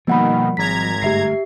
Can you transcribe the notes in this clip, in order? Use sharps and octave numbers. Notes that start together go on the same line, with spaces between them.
B2 D#3 F3 G3 A#3 F#5 B5
G#1 A#5 G#6 B6
G1 A3 G4 E5 C7